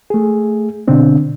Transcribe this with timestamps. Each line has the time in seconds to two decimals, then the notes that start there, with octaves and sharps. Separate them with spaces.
0.10 A3 G#4
0.88 B2 D3 C4 D4